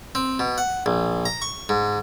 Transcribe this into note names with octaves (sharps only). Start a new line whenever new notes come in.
C4
B2
F#5
A#1
A#5
C#6
G#2